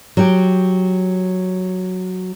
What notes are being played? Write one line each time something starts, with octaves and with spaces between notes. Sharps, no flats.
F#3 G4